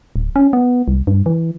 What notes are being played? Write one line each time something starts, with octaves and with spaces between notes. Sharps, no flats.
D1
C#4
B3
C2
G2
E3